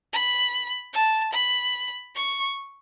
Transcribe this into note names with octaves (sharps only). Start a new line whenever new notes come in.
B5
A5
B5
C#6